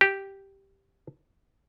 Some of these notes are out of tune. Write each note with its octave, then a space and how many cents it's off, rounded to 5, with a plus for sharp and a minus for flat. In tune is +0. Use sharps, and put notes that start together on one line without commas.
G4 -5